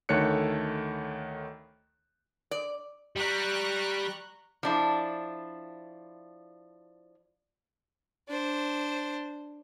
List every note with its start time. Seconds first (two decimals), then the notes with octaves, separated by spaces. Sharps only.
0.09 D2 D#3 A3 C#5 F#6 C#7
2.51 D5
3.16 G3 A#5 C#6 F#6
4.63 F3 D4 E4
8.29 D4 C5